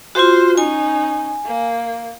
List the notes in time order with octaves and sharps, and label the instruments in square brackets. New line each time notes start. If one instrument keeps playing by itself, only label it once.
[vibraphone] F4 F#4 [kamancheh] C5
[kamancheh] C#4 D#4 [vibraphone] G#5
[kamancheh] A#3